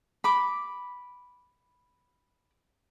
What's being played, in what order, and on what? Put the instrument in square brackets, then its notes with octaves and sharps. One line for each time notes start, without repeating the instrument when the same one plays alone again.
[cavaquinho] B5 D6